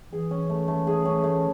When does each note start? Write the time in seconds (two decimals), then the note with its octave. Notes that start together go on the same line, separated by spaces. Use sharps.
0.13 E3 G#4
0.31 C#4
0.50 A3
0.68 A3
0.87 G#4
1.05 C#4
1.24 A3